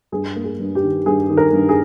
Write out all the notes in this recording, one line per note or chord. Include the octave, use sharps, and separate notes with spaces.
G2 G#4
A#3
G#4
G2
G4
D#3
G2 G#4
D#3
A#4
G2
G#4